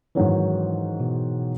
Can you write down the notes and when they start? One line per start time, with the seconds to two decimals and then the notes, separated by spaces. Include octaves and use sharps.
0.15 G#2 D#3 E3 F#3 C#4
1.00 B2